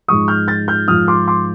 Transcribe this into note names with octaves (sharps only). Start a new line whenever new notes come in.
G#2 F3 C#6 D#6
F6 G6
G6 A6
F6 G6
G#2 F3 D#6 F6
C6 D6
C6 D6